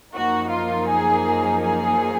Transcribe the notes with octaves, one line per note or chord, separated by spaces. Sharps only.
F#2 F3 A#3 D#4 F#4
F4
G#4
G#4